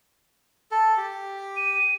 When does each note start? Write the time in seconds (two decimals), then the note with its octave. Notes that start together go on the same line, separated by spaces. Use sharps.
0.71 A4
0.97 G4
1.57 D#7